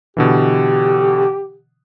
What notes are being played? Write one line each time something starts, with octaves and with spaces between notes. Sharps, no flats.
B2 D3 E3 G4